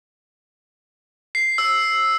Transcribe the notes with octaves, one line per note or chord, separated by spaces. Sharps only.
C7
E6